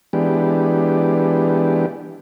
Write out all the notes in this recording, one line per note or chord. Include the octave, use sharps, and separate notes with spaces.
E3 G#3 B3 D4 G4